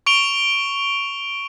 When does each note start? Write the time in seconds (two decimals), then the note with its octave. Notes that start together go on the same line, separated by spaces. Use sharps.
0.06 C#6 D7 F7 G7